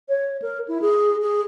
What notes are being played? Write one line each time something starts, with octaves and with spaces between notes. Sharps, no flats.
C#5
A#4
E4
G#4
G#4